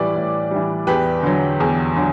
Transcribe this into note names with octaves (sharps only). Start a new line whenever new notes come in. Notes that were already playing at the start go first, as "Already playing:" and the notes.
Already playing: A2 E3 G3 B4 D5
A2
E3 G3
E2 G4 B4
D3 F#3
E2
D3 F#3